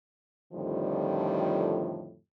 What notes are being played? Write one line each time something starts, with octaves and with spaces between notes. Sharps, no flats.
F2 A2 D3 D#3 F3 G3